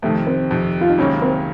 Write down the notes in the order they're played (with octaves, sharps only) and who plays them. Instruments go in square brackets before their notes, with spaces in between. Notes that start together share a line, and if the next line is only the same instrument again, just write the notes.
[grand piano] F2 C3 D#3 [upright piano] A3
[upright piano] C4
[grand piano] F2 C3 D#3
[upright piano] F4
D#4
[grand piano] C#2 C3 D#3 F#3 A#3 [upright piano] C#4
[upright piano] C4